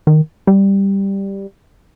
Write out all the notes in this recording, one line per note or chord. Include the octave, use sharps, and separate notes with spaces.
D#3
G3